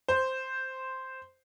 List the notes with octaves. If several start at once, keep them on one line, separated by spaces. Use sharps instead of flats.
C5